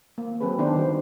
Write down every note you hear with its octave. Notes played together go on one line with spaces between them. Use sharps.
A#3
F#3 C4 G#4 A4 B4
D#3 B3 D4 D#4 C5
D3 G3 D#4 F#4 C5